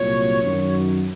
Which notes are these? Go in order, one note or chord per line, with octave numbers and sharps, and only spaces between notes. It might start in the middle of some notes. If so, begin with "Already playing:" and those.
Already playing: C2 A#2 F#3 C#5
F#2 D#3 F#3